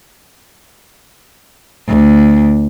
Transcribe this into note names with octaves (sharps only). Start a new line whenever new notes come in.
D2